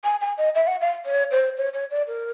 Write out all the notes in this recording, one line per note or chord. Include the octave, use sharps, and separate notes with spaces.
G#5
G#5
D#5
E5
F#5
F5
C#5
C5
C#5
C#5
D5
A#4